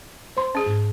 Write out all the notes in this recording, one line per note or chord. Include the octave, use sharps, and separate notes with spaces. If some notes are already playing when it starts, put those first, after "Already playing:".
C5 C6
C#4 G#4
G#2